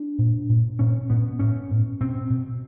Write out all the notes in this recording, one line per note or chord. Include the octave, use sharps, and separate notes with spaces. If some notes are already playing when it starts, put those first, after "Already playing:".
Already playing: D4
A#2
A#2
A#2 C#4
A#2 B3
A2 C#4
A2
B2 C4
B2